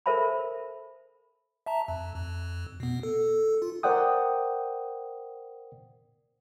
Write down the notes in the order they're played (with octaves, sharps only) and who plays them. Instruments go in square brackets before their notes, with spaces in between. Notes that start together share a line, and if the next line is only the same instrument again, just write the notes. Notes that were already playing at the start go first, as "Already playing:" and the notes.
[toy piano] A4 A#4 C5 E5 A5 B5
[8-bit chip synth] E5 A5 A#5
F2
F2
B2 B3
A4
F4
[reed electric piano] A#4 C5 D5 F#5 G5 D#6